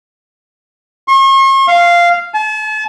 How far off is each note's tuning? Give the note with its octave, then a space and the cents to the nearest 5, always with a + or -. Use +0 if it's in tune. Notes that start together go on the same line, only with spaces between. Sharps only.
C#6 -45
F5 -10
A5 -40